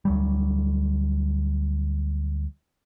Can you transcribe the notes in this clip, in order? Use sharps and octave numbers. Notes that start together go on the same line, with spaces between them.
D2 F#3 G3